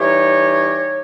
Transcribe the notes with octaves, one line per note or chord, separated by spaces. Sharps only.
E3 G3 D#4 G4 C#5